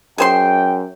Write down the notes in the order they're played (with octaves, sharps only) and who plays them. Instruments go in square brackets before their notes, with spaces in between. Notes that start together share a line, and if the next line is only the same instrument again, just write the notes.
[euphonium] F#2 [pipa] G#4 C5 C6 [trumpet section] G5